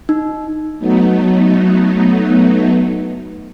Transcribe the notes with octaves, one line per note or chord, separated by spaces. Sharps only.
D#4
F#3 A3 B3 D#4